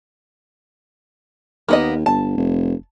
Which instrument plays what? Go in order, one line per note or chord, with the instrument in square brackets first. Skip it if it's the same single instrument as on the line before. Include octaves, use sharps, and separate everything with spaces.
[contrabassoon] D#2 [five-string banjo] A#3 B3 D#5
[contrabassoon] G1 [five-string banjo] A5
[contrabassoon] F1